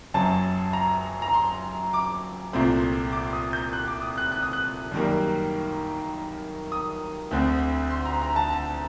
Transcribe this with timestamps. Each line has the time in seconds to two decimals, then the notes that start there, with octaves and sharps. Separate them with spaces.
0.14 F#1 F#2 F#3 A5
0.73 A#5
1.22 A#5
1.33 C6
1.93 D6
2.53 C2 A#2 A3 C4
3.12 D6
3.33 D#6
3.53 G6
3.73 F#6
3.87 D6
4.02 D#6
4.18 F#6
4.32 F#6
4.43 D#6
4.53 F#6
4.91 F#2 D#3 G3 A#3
6.72 D#6
7.31 D2 D3 A3 C4
7.90 C6
8.05 A#5
8.21 A#5
8.36 A5
8.50 A5